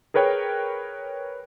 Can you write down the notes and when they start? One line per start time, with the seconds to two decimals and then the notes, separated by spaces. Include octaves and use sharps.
0.14 G#4 A#4 B4 C#5 G5